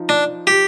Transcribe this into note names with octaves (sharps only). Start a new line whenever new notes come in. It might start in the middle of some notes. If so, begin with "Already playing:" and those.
Already playing: F3 D#4
D4
G4